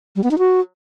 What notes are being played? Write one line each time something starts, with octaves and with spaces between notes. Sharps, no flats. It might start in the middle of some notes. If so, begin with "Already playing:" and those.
G3
B3
D#4
F#4